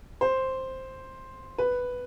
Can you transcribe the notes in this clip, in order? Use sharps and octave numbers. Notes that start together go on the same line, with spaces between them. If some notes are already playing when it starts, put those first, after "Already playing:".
C5
B4